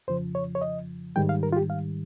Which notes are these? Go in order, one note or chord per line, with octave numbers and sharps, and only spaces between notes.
F2 C#3 F3 C5
C#5
C#5
D#5
G#2 D#3 G3 G5
F5
A#4
F4
G4
F5